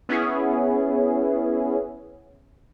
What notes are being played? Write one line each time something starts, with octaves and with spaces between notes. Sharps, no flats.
B3 C#4 E4 G#4